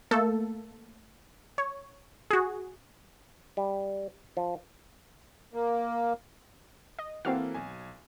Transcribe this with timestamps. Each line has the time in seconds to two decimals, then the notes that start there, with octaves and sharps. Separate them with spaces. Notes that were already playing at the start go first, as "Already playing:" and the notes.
0.11 A3 A#3 A4
1.58 C#5
2.30 F#4 G#4
3.57 G3
4.37 F3
5.54 A#3
6.99 D#5
7.25 E3 A#3 C4 F#4 A4 F5
7.54 B1 G#5